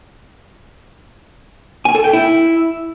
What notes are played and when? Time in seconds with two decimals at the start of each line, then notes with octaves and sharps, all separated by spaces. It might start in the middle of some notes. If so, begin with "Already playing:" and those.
1.85 G#5
1.95 A4
2.04 G5
2.13 E4